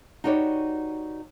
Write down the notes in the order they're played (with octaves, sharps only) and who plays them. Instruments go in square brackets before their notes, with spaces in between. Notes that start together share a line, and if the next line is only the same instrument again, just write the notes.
[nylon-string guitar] D#4 F#4 G4 B4 C#5 D5